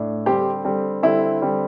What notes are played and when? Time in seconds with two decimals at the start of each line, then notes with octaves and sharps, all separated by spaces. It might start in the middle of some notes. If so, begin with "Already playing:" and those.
Already playing: A2 D4
0.26 D3 G3 C4 G4 C5
0.64 D3 G3 C4
1.03 D3 G3 C4 E4
1.41 D3 G3 C4